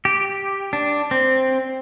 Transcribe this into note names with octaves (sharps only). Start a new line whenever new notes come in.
G4
D4
C4